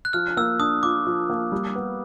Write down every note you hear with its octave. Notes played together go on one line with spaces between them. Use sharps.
F#6
F3 F6
A#3 E6
D4 D#6
F4 D6
F3
A#3
G3
B3